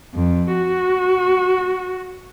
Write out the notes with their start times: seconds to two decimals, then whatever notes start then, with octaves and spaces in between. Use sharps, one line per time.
0.14 F2
0.54 F#4